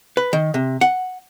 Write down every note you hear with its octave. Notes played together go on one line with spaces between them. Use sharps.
B4
D#3
C3
F#5